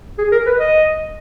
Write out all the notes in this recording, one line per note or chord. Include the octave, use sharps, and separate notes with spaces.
G#4
A#4
B4
D#5